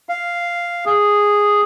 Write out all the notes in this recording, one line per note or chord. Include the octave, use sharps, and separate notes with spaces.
F5
G#4